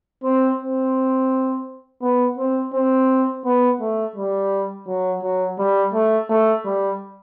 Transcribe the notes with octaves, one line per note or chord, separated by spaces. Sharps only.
C4
C4
B3
C4
C4
B3
A3
G3
F#3
F#3
G3
A3
A3
G3